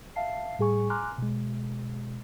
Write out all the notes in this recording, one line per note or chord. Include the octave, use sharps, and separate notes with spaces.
E5 F5 A5 C7
A2 G3 G#4 G#5 C#6
G#5 A#5 C6 D6 F6 F#6
B2 G#3